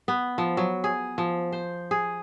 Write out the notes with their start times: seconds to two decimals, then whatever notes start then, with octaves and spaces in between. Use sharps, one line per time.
0.08 B3
0.38 F3
0.57 F#3
0.84 G#4
1.18 F3
1.52 C5
1.91 G#4